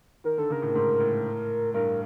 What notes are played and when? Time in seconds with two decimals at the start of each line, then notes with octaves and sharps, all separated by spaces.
0.24 D#3 A#4
0.37 D3 A4
0.50 C#3 A#4
0.62 A2
0.75 G#2
1.00 A2
1.74 G2 A#4